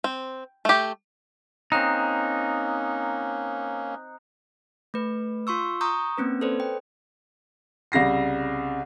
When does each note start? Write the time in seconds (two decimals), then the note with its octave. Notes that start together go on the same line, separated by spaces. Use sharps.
0.04 C4
0.65 A3 G4
1.72 A#3 C4 C#4 D#4 A#5 D#6 F#6
4.94 A3 B4
5.47 F4 C6 C#6 E6
5.81 A#5 C#6 D#6 G6
6.17 A#3 C4 C#4 B4
6.41 A4 B4 C5 D5
6.60 G5
7.92 C2 C#3 A#6 C7